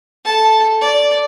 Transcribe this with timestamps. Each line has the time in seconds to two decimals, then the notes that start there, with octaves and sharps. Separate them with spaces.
0.25 A4 A5
0.81 D5